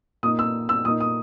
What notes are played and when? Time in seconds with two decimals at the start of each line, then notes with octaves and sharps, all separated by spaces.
0.23 A#2 A#3 D#4 D#6
0.39 E6
0.69 E6
0.85 A#2 A#3 D#4 D#6
1.00 D#6